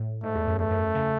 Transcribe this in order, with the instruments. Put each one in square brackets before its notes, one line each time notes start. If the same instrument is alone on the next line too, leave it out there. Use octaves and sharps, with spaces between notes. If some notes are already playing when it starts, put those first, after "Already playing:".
Already playing: [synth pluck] A2
[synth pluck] G#2 [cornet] A3
[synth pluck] E2
F#2
[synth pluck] E2 [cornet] A3
[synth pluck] F#2
C#3